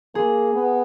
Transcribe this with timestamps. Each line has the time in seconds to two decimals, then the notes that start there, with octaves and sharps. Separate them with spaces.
0.15 A#3 G#4
0.54 B3